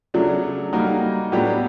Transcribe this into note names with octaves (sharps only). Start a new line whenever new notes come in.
C#3 F#3 A3 D4
G3 A#3 D#4 F#4
A2 F#3 B3 D4 G4